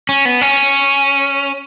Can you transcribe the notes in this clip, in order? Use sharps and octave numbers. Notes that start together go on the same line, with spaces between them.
C#4
B3
C#4